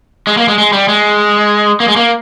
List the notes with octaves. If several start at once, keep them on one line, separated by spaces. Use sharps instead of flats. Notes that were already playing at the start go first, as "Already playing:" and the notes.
G#3
A#3
G#3
G#3
G3
G#3
A#3
G#3
A#3